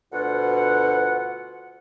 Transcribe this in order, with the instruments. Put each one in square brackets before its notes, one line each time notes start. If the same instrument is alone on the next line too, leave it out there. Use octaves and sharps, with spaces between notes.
[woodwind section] D2 B2 F4 F#5